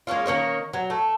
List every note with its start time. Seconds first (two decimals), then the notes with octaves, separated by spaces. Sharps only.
0.07 G#3 A#3 C#4 F4
0.26 D#3 A#3 C#4 A#4
0.73 F#3
0.90 A3